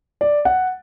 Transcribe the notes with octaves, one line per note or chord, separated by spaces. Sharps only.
D5
F#5